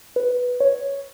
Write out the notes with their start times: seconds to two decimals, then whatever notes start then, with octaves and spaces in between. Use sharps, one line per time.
0.16 B4
0.60 C#5